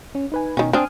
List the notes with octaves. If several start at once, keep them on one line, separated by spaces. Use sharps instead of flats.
C#4
D#4 B4 G#5
B2 D#3 C#4
C4 D4 G#5 D#6 F6